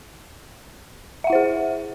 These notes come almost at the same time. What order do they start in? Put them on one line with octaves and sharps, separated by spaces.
E5 F#5 E4 C5 G#4